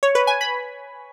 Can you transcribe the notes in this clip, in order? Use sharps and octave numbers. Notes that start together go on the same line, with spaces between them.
C#5
B4
G#5
B5